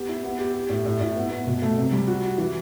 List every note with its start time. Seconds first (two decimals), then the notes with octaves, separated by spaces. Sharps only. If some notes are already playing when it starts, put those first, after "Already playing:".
Already playing: B3 G4
0.09 E4
0.24 B3
0.39 G4
0.54 G4
0.69 A2
0.86 A2
1.01 A2
1.16 B3
1.31 B3
1.47 B2
1.62 A3
1.78 C3
1.92 G3
2.07 F#4
2.23 F#4
2.38 E3